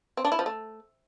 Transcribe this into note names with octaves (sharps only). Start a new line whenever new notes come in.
C4
D4
E4
F3
A3